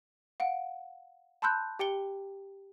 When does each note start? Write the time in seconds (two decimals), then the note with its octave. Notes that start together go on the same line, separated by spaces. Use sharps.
0.40 F5 F#5 D7
1.42 A5 B5 C6 E6 F#6 G6
1.79 G4 G5 C#7 G7